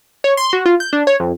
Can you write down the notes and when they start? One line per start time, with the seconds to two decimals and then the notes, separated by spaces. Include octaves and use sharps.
0.24 C#5
0.37 C6
0.53 F#4
0.66 F4
0.80 G6
0.93 D4
1.07 C#5
1.20 F2